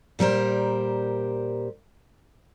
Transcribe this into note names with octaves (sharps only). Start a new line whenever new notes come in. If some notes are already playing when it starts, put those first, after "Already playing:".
A#2 G3 A#4 C5